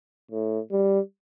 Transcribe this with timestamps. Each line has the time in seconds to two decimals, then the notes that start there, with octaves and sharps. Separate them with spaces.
0.31 A2
0.71 G3